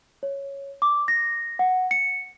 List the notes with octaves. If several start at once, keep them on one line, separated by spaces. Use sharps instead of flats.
C#5
D6
A#6
F#5
C#7